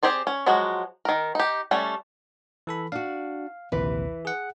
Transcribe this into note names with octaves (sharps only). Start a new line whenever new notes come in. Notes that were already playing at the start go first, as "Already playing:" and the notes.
C4 G4 G#4 C5 D5
C#4
F3 F#3 G#3 F#4
D#3 A#4
D#4 G4
G3 A3 C#4
E3 A4 B5
D4 F#4 F5
A#1 D#2 C3 E3 B4
G#4 F#5